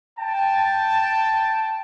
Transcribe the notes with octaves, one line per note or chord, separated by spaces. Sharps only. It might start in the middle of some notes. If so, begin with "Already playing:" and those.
G5 A5